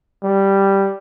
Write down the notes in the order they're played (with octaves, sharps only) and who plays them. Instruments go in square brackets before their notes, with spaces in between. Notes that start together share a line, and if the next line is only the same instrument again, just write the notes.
[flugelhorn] G3